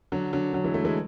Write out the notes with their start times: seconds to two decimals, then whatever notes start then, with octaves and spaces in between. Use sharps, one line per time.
0.12 D3 F#3
0.33 D3 F#3
0.53 D3 F#3
0.64 E3 G#3
0.74 F#3 A3
0.84 E3 G#3